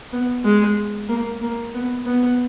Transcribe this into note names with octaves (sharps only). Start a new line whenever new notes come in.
B3
G#3
A#3
A#3
B3
B3